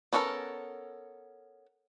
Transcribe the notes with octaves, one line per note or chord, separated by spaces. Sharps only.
B3 C#4 D4 A4 A#4